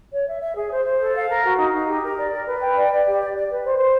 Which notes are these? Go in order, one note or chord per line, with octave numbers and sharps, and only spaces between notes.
C#5
E5
E5
G#4
C5
C5
A4
F5
A#4
F#4
D#4
D#4
G4
A#4
D5
A#4
B4
G5
D5
D5
G4
D5
D5
B4
C5
C5